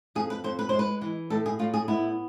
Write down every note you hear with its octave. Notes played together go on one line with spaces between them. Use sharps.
F2 G#4
B4
F2 C5
B4
G#3 C5
B4
E3
A2 A4
G#4
A2 F4
G#4
B3 E4